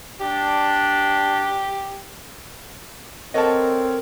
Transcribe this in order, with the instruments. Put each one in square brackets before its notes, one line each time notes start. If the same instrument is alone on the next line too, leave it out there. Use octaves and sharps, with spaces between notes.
[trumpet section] D4 [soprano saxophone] G4
[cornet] C4 [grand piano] A4 C#5 F#5 [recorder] A#4 [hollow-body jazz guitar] D#5 A5